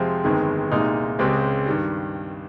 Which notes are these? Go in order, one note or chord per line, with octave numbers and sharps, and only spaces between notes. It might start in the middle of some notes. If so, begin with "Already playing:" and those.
Already playing: F2 C3 F3 G#3 C4
G1 F2 D#3 G#3
C2 A#2 G#3 D#4
C#2 C#3 G#3 C4 G4
G2 D#3 G3